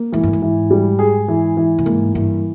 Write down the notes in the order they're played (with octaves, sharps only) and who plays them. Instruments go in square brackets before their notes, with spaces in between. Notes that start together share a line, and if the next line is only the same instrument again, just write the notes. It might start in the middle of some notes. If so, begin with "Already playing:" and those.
Already playing: [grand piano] A#3
[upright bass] G#2 [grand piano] E3
[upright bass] G2
G#2
[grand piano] E3
G3
G#4
E3
E3
[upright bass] A#2
[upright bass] G#2 [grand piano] A#3
[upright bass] G2 [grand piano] E3